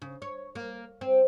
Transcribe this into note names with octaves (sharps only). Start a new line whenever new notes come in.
C#3
C#5
A#3
C4